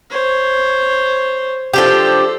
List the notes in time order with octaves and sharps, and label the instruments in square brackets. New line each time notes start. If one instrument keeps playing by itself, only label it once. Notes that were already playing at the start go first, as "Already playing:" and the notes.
[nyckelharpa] C5 C#5
[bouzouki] F3 D4 G4 [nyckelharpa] A4 C5